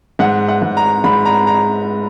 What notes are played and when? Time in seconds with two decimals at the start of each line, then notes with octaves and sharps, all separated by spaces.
0.19 G#2 F#5
0.48 F#5
0.62 G#2
0.77 A#5
1.04 G#2 B5
1.25 A#5
1.47 A#5